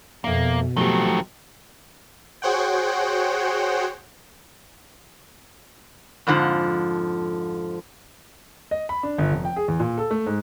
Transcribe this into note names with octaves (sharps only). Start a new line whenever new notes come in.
F2 B2 A#3 E5
D#3 F3 F#3 A3 C4 G4
F#4 G#4 C5 C#5 F#5 G5
F2 G#2 D3 F3
D#5
B5
D4
G1
F1
G5
G#4
E2
A#2
A4
A3
G#2